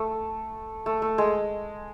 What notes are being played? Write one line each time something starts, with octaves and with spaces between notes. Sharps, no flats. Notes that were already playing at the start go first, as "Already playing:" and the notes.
Already playing: A3
A3
A3
G#3